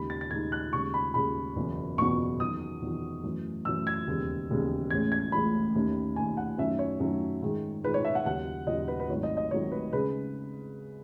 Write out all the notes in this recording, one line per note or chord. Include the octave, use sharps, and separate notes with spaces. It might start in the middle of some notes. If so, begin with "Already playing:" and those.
Already playing: D#2 C#3 G#3 D#4 B5
A6
A6
D#2 C#3 G#3 D#4 G#6
F#6
D#2 C#3 G#3 C#6
B5
D#2 C#3 G#3 B5
F#1 E2 B2
F#1 E2 B2 C#6
E2 D#3 F#3 D#6
E2 D#3 F#3
F#2 E3 A3
F#2 E3 A3 E6
G#6
E1 D#2 C#3
E1 D#2 C#3
A1 A2 G#3 C#4 G#6
G#6
A1 A2 G#3 C#4 B5
D#2 D#3 A3 C#4
D#2 D#3 A3 C#4 G#5
F#5
F#2 D#3 F#3 A3 C#4 E5
C#5
F#2 D#3 F#3 A3 C#4
G#2 D#3 G#3
G#2 D#3 G#3 B4
C#5
E5
F#5
D#2 C#3 F#3 F#5
D#2 C#3 F#3 D#5
B4
B4
G#1 G#2 D#3 F#3 A3 C#5
D#5
D#5
G#1 G#2 D#3 F#3 A3 C#5
B4
C#3 G#3 B4